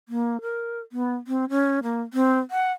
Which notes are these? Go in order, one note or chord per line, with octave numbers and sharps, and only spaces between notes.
A#3
A#4
B3
C4
C#4
A#3
C4
F#5